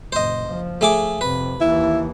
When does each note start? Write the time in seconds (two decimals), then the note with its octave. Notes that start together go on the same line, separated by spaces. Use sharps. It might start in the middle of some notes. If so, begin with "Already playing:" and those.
0.12 F#1 A#2 C5 D#5
0.48 F3
0.81 A3 G#4 D6
1.21 F2 C3 B4
1.61 D#2 E3 E4